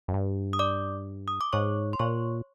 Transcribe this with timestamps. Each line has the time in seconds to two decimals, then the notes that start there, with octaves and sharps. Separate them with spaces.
0.08 F#2
0.14 G2
0.53 D#6
0.59 D5 D6
1.28 D#6
1.41 D6
1.53 G#2 C#5 C#6
1.93 C6
1.99 A#2 C#5 C#6